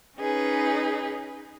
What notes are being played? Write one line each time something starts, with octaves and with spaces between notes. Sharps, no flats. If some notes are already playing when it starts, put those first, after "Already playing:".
C#4 D#4 G#4 B4